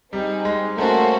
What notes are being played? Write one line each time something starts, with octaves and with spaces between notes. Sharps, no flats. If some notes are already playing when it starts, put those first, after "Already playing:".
G3 C4 D#4 G#4
G#3
A3 A#3 C#4 F#4 A4 C5